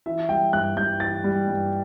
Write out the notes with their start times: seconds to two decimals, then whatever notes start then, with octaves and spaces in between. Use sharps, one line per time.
0.06 E3 E5
0.29 G3 G5
0.53 G2 F#6
0.76 G2 G6
1.00 E3 A6
1.24 G3
1.47 G2